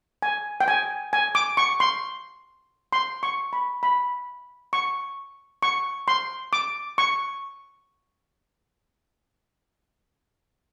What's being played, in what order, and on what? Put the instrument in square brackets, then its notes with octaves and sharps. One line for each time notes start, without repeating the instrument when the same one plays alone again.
[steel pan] G#5
G5
G#5
G#5
D6
C#6
C6
C6
C#6
B5
B5
C#6
C#6
C6
D6
C#6